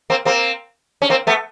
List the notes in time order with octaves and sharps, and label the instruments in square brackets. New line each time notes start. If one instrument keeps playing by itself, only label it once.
[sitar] A#3 C4
A#3 C4
C#4
A#3 C4
A3 B3